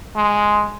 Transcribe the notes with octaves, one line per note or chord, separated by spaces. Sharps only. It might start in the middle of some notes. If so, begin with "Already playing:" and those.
G#3